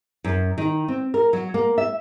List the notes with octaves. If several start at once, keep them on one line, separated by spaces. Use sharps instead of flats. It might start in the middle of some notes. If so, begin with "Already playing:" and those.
F#2
D#3
C4
A#4
F#3
A#3
E5